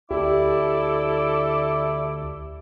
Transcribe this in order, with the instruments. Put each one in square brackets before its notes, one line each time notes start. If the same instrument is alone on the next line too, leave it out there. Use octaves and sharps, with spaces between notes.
[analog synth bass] D2 [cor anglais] E4 [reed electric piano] G4 [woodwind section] A4 D5 D6